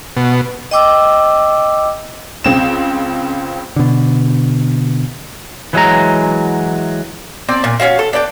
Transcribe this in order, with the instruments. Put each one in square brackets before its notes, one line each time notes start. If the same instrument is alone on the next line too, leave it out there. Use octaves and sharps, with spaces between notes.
[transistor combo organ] B2
[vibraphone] D#5 G5 D6 E6
[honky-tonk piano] C#2 C4 E7
[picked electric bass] B2 D3
[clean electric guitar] E3 F#3 G#3 A#5
[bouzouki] C4 D4 D5
A#2
C#4 E4 F#4 F5
A4
D4 D5 F#5 G5